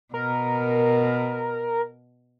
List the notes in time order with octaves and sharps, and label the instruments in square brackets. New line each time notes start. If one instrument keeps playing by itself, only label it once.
[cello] B2 [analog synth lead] A#4